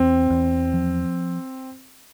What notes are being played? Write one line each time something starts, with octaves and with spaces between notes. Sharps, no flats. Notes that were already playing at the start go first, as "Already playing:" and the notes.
Already playing: E2 C4
E2
F3